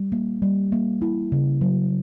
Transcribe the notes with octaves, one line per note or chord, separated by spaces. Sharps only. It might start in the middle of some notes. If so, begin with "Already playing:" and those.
Already playing: G3
A#3
G3
A#3
E4
C#3
F#3